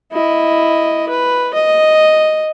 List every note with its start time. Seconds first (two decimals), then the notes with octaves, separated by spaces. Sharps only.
0.12 E4 D#5
1.09 B4
1.54 D#5